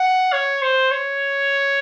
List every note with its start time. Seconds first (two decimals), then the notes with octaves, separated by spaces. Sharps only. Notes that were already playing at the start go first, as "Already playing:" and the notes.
Already playing: F#5
0.32 C#5
0.62 C5
0.91 C#5